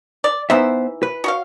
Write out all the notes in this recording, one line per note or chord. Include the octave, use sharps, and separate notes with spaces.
D5
E3 B3 D#4 C5 E5
B4
F#4 C#5 F5